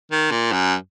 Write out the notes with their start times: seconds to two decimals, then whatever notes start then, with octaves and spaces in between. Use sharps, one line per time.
0.11 D#3
0.31 A#2
0.52 F#2